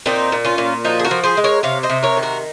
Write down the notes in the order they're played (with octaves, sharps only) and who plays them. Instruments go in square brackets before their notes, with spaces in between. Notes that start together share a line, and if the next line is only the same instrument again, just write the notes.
[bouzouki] A#2 C4 D#4
A#2
C#4 F4
A#2
F3 D#4 F#4
G#4
F#4 A#4
F3
G#4 C5
G#3
A#4 C#5
C3 C#5 F5
C5 D#5
C3
A#4 C#5
D#3
F#4 A#4